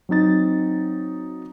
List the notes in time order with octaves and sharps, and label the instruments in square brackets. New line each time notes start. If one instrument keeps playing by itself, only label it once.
[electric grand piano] F#3 C4 D#4 A6